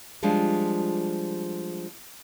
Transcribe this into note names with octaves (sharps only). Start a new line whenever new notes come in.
F3 G3 G#3 D4 F4